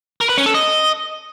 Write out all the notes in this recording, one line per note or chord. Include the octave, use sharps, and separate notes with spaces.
A#4
B4
C#4
A4
D#5